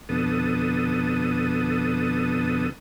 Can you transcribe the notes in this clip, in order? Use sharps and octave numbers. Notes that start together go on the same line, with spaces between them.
F2 B2 D3 B3 A4 D#6